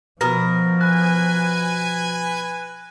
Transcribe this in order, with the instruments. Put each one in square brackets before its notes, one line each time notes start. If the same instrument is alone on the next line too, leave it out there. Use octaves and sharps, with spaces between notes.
[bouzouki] B2 A#4 [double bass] F3 [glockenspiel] A#6
[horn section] B4 G#5 [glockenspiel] F#6